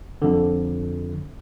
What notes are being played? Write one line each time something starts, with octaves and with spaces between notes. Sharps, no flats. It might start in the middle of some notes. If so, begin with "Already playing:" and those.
F2 D3